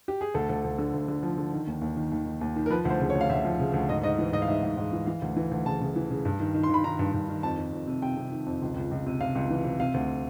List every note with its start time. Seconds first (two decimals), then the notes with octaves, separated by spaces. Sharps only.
0.08 G4
0.21 G#4
0.34 D2 A4
0.49 D2
0.64 D2
0.79 D3
0.94 D2
1.08 D3
1.23 F3
1.38 D3
1.53 D#3
1.67 D#2
1.82 D#2
1.97 D#3
2.12 D#2
2.26 D#3
2.41 D#2
2.56 D#3
2.66 A#4
2.70 F3 B4
2.85 D2
2.90 C5
3.00 C#3
3.10 C#5
3.15 D2
3.21 F5
3.30 D2 E5
3.45 F3
3.59 C#3
3.74 D2
3.89 G#2 D#5
4.03 G#2 D#5
4.19 E3
4.33 G#2 D#5
4.42 F5
4.48 G#2 E5
4.63 G#2
4.77 G#2
4.93 E3
5.07 E3 F5
5.22 D2
5.37 E3
5.51 D2
5.66 C#3 A5
5.81 C#3
5.96 E3
6.11 C#3
6.25 G2
6.40 D#3
6.54 D#3
6.63 C6
6.70 D#3 B5
6.84 D#3 A#5
6.99 G2
7.14 G2
7.29 D#3
7.43 F2 A5
7.59 F2
7.73 F2
7.87 C3
8.02 C3 G5
8.17 C3
8.32 D#3
8.46 F2
8.62 C#2
8.76 C#2
8.91 C#2
9.06 C3
9.21 C3 F5
9.35 C#2
9.50 E3
9.65 C3
9.80 C3 F5
9.94 D2